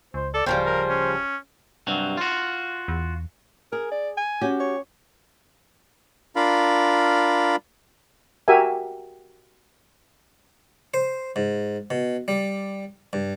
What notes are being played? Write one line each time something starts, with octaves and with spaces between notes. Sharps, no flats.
C#2 C5
A4 D5
D1 C#3 F3 G3 C5 G5
A#4
C#4
G2 C3 F#3
F4 F#4
E2
G#4 A#4
D5
G#5
C#4 F#4 G4
C#5
D4 F4 A#4 F5 B5
F#4 G4 A#4 E5 G#5
C5
G#2
B2
G3
G2